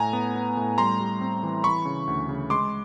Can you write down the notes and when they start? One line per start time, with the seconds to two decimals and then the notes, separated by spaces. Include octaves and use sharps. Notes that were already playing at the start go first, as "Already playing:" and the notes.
Already playing: A2 G#5 A#5
0.13 B3
0.35 B3
0.57 A2
0.78 G3 A#5 C6
1.00 G3
1.21 C4
1.43 E3
1.64 E3 B5 C#6
1.85 C#3
2.07 D2
2.29 C#3
2.50 G#3 C6 D6